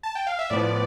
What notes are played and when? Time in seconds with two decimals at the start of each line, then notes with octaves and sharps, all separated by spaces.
0.03 A5
0.15 G5
0.27 F5
0.39 E5
0.50 A2 F3 B3 D5